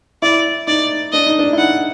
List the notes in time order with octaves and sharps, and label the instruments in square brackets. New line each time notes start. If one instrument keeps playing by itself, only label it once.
[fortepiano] E4 [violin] D5
[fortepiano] D#4 [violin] D5
[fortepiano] D4 [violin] D#5
[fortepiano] D#4
D4
E4
[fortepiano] D#4 [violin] F#5